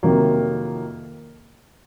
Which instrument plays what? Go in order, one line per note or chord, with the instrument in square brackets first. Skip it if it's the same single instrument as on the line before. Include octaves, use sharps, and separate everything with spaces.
[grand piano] F2 C3 D#3 F#3 A#3